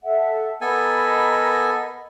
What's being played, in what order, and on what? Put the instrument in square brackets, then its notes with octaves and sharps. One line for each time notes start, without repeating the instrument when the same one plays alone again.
[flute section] A4 E5 F#5
[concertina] B3 A4 G#5 [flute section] A#4 D#5 B5